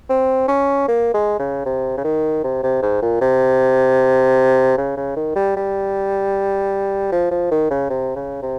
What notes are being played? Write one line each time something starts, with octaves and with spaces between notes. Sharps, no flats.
C4
C#4
A#3
G#3
C#3
C3
C#3
D#3
C3
C3
G#2
A#2
C3
C#3
C#3
D#3
G3
G3
F3
F3
D#3
C#3
C3
C#3
C3